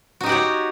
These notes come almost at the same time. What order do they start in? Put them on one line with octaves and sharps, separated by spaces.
F#4 D#4 G4 F#5 C#5